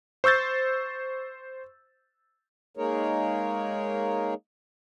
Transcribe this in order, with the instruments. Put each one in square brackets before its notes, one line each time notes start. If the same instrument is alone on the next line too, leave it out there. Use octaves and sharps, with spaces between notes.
[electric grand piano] C5 C#6 E6 G6 A6
[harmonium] G#3 A#3 D#4 G#4 A#4 C#5